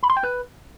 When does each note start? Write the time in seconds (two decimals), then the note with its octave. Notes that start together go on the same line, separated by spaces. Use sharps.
0.03 B5
0.10 C6
0.17 G5
0.24 B4